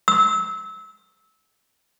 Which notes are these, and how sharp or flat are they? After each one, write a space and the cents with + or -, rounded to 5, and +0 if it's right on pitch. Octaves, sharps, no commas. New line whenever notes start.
E6 -25